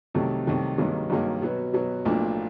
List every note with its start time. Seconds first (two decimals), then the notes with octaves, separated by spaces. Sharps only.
0.14 C2 C3 D#3 F#3 A3
0.47 C2 C3 D#3 F#3 A3
0.78 G#1 G2 D#3 F#3 A#3
1.10 G#1 G2 D#3 F#3 A#3
1.42 B2 F#3 B3
1.73 B2 F#3 B3
2.05 B1 A2 F3 A#3 D4